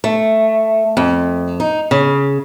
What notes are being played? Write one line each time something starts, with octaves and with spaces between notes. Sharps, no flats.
A3
F2
D#4
C#3